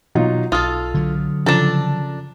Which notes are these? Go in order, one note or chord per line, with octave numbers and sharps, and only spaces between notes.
B2 F#3 D#4 F4
B1 F4 A4 D#6 F6
D3 F#3
C#3 F3 D4 A4 A#5 A6 E7